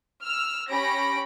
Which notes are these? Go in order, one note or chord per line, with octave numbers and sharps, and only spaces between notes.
E6 F6
C#4 G4 B5 A#6 D7